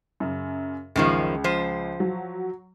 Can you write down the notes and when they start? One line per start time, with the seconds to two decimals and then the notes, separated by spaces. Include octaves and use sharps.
0.20 F#2 C#3
0.96 C#2 F#2 D#3 F3
1.44 F3 C5
2.00 F#3